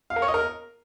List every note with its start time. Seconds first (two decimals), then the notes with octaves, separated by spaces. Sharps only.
0.10 F5
0.16 A#4
0.22 C#5
0.28 D#5
0.34 A#4